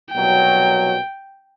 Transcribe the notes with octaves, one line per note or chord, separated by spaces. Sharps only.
C2 B2 F#3 G5